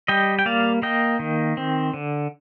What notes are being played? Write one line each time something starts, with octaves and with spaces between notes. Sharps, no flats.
G3 D#5 G5
G5
A#3 D5 F5
A#3 D#5 G5
D#3
C4
D3